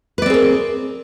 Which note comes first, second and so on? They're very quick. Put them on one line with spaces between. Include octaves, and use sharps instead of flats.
B4 D5 C4 G#4 A#4